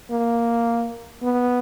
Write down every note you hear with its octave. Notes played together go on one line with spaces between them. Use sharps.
A#3
B3